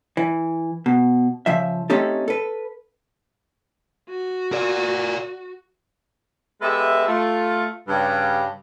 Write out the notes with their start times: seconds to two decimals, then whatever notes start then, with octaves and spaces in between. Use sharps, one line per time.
0.17 E3
0.86 B2
1.46 C#3 F3 E5
1.90 A3 C4 C#4 D#4 G4 A4
2.28 A4 B4
4.10 F#4
4.52 A#4 D5
6.61 G#3 B3 G4 A4 E5
7.08 A3 F4
7.88 G2 C#3 G3